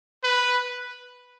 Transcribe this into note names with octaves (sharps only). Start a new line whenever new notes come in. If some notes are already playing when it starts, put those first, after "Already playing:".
B4